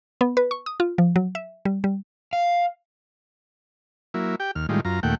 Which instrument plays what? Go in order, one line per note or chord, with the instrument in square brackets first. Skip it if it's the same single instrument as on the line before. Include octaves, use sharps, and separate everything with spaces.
[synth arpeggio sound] B3
B4
C#6
D#6
F4
F3
F#3
E5
G3
G3
[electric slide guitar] F5
[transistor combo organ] F#3 A#3 E4
G4 G5
D#2 F6
A2 D#3 G3 G#3 F4
F#2 F4 A#5
D#2 A#2 A3 F#5 G5